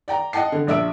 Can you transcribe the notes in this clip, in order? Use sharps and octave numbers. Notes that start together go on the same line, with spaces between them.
D5 G5 A#5
D#5 F#5 G5 A5 C7
D3
A#1 D4 E5 E6 D7